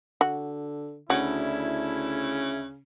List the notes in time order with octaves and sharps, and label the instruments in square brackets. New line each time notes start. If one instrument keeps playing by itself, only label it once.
[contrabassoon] D3 [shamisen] F#4
[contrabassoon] D2 [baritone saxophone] C#3 [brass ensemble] D4 E4 [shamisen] F#4